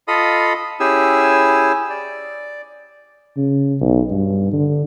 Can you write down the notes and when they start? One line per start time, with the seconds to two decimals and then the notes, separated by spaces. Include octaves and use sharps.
0.08 F4 A4 D#5 F5 B5 D#6
0.80 C#4 E4 G4 G#4 G#5 E6
1.90 D5
3.37 C#3
3.81 B1
4.11 G2
4.53 D3